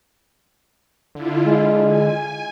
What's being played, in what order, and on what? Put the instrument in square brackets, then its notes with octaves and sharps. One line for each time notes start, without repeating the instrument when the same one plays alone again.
[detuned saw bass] D3 [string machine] E4 F4
[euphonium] G#3
[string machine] G#5